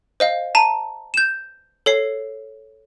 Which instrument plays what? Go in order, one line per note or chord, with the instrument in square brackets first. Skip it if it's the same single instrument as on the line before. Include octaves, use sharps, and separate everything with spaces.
[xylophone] C5 D#5 F5
A5 A#5 D#7
G6 E7
A4 C#5 C7